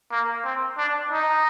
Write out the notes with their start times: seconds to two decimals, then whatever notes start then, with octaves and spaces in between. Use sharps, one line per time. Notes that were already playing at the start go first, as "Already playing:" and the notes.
0.11 A#3
0.44 C4
0.77 D4
1.11 D#4